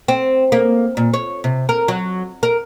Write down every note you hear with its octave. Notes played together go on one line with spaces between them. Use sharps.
C4
A#3
A#2
C#5
C3
A#4
F#3
A#4